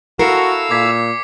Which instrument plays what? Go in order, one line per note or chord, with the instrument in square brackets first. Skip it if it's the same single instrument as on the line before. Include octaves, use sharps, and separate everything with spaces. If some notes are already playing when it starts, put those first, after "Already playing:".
[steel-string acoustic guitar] E4 A4 A#4 [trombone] F#4 [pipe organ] F5 E6 [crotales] C7 C#7
[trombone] A#2 [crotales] D6 G#6 B6